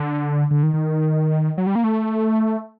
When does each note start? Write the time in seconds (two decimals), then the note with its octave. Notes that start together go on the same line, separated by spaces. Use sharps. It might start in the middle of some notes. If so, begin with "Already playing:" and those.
Already playing: D3
0.51 D3
0.63 D#3
0.74 D#3
1.58 F#3
1.67 G3
1.75 A#3
1.84 A3